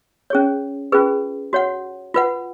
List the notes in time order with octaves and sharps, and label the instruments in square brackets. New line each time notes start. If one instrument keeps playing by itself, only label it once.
[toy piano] C#4 G#4 C#5
C#4 F4 G#4 B4
F#4 C#5 F#5
F4 B4 F#5